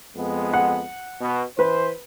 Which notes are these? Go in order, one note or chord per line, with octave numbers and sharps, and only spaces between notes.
F2 G#3 B3
F#5
B2
E3 B4 C5